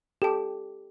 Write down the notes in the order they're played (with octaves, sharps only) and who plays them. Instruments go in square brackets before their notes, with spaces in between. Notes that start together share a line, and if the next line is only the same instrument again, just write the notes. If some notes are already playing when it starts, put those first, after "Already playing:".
[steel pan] G4 [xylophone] A4 A5